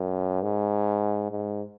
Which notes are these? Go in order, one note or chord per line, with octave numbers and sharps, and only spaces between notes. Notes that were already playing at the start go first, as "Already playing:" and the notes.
Already playing: F#2
G#2
G#2